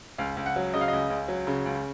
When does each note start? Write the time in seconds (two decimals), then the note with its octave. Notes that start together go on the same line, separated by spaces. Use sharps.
0.18 C#2 F5
0.37 C#2
0.46 F#5
0.56 F#3
0.74 C#3 D#5
0.81 F5
0.88 C#2 D#5
1.10 C#2
1.28 F#3
1.47 C#3
1.65 C#2